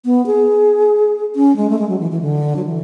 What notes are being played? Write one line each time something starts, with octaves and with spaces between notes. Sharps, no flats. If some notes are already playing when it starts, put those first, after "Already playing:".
B3
G#4
C#4
G#3
A3
G#3
F#3
E3
E3
D3
F#3
E3